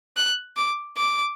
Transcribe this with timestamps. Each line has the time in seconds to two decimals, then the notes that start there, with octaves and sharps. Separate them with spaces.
0.17 F#6
0.57 D6
0.96 D6